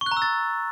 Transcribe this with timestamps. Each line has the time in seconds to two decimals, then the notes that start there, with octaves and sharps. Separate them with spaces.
0.01 C#6
0.06 F#6
0.11 A#5
0.17 E6
0.22 A6